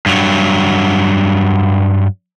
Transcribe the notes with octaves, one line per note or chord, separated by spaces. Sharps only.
G2 F#3